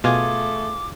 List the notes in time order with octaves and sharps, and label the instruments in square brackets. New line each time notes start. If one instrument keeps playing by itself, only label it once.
[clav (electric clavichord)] B2 [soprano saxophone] A3 [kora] F4 G#4 [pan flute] D6